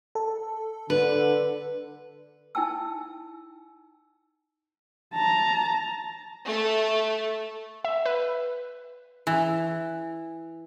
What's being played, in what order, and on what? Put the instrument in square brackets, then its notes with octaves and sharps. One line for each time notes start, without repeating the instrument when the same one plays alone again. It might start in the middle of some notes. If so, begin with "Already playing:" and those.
[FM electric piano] A4
[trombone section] D3 [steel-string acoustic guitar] B4
[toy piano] D#4 E4 G5 A5 E6
[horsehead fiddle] A5 A#5
[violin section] A3
[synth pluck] E5
B4
[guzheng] E3